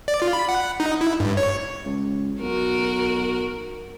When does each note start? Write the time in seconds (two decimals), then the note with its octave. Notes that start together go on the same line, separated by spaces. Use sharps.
0.08 D5
0.22 F4
0.33 B5
0.49 F#5
0.80 D#4
1.01 E4
1.20 G2
1.37 C#5
1.85 C#2
2.41 B1 F#4 A#4